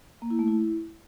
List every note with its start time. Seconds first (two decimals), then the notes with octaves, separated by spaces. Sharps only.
0.22 A#3
0.30 E4
0.39 A3
0.48 E4